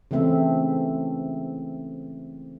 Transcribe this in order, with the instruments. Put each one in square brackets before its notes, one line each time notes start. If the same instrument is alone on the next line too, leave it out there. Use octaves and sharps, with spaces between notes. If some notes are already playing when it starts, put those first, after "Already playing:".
[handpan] C#3 E3 A3 C4 E5